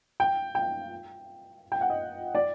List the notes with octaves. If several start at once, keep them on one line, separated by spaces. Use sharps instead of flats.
G5
G5
G5
F#5
D#5
D5